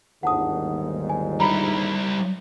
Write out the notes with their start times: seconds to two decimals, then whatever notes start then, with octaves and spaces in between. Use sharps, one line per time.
0.23 G1 D#2 G#2 F#5 A5 D#6
1.10 G#5
1.40 G3 E4 A#5 B5